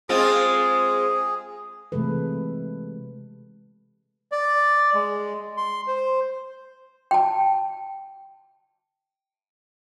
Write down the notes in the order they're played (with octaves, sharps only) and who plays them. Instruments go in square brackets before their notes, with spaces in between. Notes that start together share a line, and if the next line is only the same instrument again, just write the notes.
[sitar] G#3 C4 F4 [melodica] G#4
[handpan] C3 E3 G#3 A3 A4 B4
[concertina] D5
G#3
C6
C5
[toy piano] G5 A5